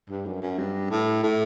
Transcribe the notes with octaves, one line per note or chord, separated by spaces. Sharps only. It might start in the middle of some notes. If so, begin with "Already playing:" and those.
G2
F#2
F#2
G2
A2
A2